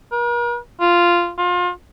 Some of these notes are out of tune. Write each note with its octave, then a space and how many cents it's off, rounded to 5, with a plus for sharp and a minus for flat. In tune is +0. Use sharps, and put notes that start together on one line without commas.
A#4 +45
F4 -5
F4 +30